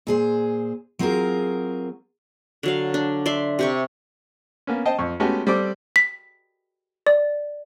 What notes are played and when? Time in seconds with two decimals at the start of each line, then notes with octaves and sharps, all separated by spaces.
0.07 A#2 G#4 C5
0.99 F#3 C4 F4 G#4 A#4
2.63 D3 F#3 F5
2.94 D4
3.26 D5 E5 C6
3.59 C3 G4 C#6
4.67 A#3 B3 C#4
4.86 C5 D#5 G5 A5
4.99 F2 C#6
5.20 G#3 A3 B3 C#4 F#4 G4
5.47 G3 C4 A4 D5 D6
5.96 B6
7.07 D5